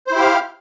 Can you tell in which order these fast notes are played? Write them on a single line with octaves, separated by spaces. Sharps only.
C5 E4 G4 F5